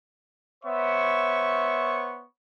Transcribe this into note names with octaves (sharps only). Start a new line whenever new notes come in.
B3 C5 C#5 E5 C#6